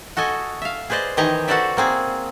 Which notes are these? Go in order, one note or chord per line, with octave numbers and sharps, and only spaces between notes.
F#4 A4 D#5 G#5
E5 F5
G#4 B4 C5 D5 D#5
D#3 E3 G4 D#5 G#5 A#5
F#4 A4 B4 C5 D5 E5
A#3 C4 G#4